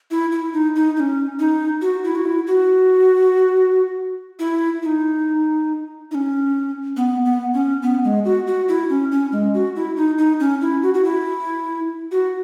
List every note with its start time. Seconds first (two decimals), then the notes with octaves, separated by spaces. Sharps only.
0.11 E4
0.32 E4
0.53 D#4
0.76 D#4
0.97 D#4
1.00 C#4
1.39 D#4
1.82 F#4
2.04 E4
2.15 F#4
2.25 E4
2.47 F#4
4.39 E4
4.83 E4
4.86 D#4
6.11 D#4
6.15 C#4
6.97 B3
7.25 B3
7.54 C#4
7.82 B3
8.04 G#3
8.25 F#4
8.47 F#4
8.68 E4
8.90 C#4
9.12 C#4
9.32 G#3
9.54 F#4
9.76 E4
9.97 D#4
10.18 D#4
10.40 C#4
10.62 E4
10.83 F#4
10.94 F#4
11.04 E4
12.12 F#4